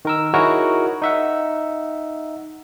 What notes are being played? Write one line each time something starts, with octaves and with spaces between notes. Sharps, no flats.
D#3 A#4 E6
D#4 E4 F#4 G#4 A#4 C#5
D#4 E5 F#5